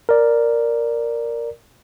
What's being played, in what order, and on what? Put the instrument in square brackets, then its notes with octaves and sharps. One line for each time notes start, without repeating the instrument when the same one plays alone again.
[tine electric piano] A#4 D5